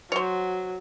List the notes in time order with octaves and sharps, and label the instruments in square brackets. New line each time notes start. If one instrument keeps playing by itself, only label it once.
[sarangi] F#3 [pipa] C5 C#5